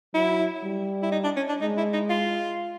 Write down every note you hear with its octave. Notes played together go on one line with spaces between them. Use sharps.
F#3 E4
G3
E4
D#4
D4
C#4
D4
G#3 D#4
E4
D#4
F4